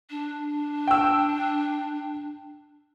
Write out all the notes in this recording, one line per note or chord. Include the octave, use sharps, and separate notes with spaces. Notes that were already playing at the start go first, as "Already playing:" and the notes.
D4
G5 E6